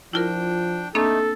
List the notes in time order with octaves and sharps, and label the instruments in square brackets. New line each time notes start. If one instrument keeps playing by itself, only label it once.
[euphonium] F3 [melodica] D4 G5 [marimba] E4 F4 A#4
[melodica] A3 D#4 [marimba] A#3 C4 D4 [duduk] A4